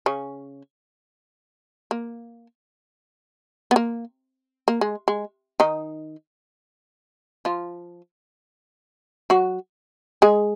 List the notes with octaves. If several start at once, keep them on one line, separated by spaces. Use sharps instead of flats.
C#3 C#4
A#3
B3
A#3
A#3
G#3
G#3
D#3 D#4
F3 F4
F#3 F#4
G#3 G#4